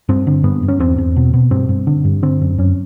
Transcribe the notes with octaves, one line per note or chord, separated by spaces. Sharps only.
G2 C4
D3
G2 B3
G2
C#4
E2 C4
E2
B2
B2
G2 C4
G2
D3
G2
D3 C4
F#2
F#2 C#4